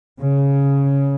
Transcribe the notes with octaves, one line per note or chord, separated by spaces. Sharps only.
C#3